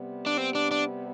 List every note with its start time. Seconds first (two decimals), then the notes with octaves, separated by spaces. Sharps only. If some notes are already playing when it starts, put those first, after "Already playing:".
Already playing: C3 G3 B3
0.26 D4
0.37 C4
0.55 D4
0.71 D4